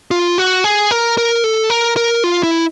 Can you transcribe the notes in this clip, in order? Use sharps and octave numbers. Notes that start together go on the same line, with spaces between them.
F4
F#4
G#4
A#4
A#4
A4
A#4
A#4
F4
E4